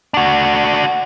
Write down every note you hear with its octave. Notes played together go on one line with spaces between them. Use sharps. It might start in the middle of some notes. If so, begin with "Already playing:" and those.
D4 F#4